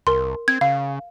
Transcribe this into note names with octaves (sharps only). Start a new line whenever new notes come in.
C2 A#4 C6
C4 G#6
C#3 F5